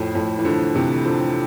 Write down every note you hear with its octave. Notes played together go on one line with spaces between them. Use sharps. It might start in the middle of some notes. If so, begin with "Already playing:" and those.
Already playing: F2 A2
F2 A2
E3
D3 F3
C3 E3
D3 F3